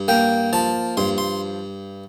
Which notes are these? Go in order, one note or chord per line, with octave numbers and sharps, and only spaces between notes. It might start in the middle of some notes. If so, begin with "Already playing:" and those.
Already playing: G2
A#3 G5
F3 A5
G2 C6
C6